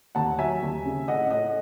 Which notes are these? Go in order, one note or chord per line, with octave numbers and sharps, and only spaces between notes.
D#2 F#5 A5
F#3 E5 G#5
D#2
C#3
A2 D#5 F#5
A2 D#5 F#5